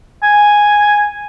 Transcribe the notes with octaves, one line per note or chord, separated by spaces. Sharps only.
G#5